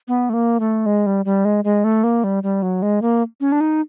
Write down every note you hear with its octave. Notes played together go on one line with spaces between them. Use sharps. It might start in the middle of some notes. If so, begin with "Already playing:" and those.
B3
A3
A#3
A3
G#3
G3
G3
G#3
G#3
A3
A#3
G3
G3
F#3
G#3
A#3
C#4
D4
D#4